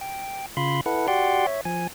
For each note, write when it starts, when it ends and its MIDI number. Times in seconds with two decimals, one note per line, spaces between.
0.01 0.46 79
0.57 0.81 49
0.57 0.81 65
0.57 0.81 83
0.57 0.81 84
0.86 1.07 64
0.86 1.07 69
0.86 1.07 71
0.86 1.07 78
1.08 1.46 66
1.08 1.46 67
1.08 1.46 74
1.08 1.46 78
1.08 1.46 79
1.08 1.46 84
1.47 1.61 73
1.47 1.61 76
1.65 1.87 53
1.65 1.87 80